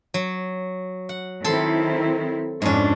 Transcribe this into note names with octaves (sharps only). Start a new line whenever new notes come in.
F#3
F#5
D#3 C4 E4 A4 C6
F2 G#2 C#4 D4